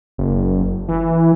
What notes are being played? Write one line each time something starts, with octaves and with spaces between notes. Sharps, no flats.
F#1
E3